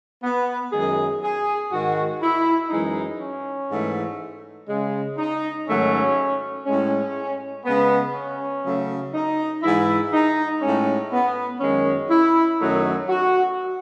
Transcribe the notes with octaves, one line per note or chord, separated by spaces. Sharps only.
B3
F#2 D#3 G#3 G#4
G#4
G#2 D#3 G#3 F#4
E4
F#2 E3 G#3 D#4
C#4
G#2 E3 A3
C#3 G#3
D#4
G#2 D#3 F#3 A3 C#4
A2 G#3 C#4
C#3 G#3 B3
C#4
C#3 F#3 A3
D#4
G#2 E3 G#3 E4
D#4
A2 G#3 C#4
B3
F#2 D#3 G#3 C#4
E4
F#2 D#3 F#3 A3 D#4
F#4